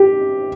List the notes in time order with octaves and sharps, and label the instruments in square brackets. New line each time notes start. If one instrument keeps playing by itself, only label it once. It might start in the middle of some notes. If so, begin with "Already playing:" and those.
Already playing: [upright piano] G4